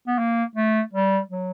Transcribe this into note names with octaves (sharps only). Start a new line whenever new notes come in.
B3
A#3
A3
G3
F#3